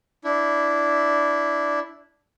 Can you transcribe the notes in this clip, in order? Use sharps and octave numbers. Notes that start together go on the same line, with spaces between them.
D4 E4